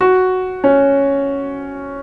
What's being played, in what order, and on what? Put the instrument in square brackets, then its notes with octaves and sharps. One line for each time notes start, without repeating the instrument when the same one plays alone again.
[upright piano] F#4
C#4